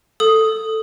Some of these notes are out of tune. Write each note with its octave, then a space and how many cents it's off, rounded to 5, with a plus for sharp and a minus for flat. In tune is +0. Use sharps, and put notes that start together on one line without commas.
A4 +5 D#6 +0